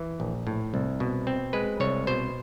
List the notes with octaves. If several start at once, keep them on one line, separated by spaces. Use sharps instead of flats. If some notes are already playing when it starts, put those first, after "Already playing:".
Already playing: E3
A#1
A2
C2
B2
C4
G#3 B4
C2 C#5
B2 C5